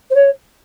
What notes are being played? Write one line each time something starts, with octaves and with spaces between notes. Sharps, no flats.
C5
C#5